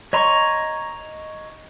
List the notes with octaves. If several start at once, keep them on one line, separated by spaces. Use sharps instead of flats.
C#5 D#5 A#5 C6 C#6